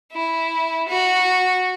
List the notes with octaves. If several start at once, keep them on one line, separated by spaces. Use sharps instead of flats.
E4
F#4